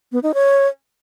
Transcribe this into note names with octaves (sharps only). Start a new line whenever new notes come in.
B3
D#4
C#5